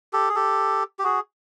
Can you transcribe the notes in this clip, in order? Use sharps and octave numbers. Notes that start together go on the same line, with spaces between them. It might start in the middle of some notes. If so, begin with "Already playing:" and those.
G4 A4
G#4
G4 A4
G4
F#4 G#4